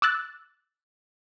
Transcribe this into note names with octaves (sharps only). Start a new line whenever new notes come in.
D6 E6 F#6 A6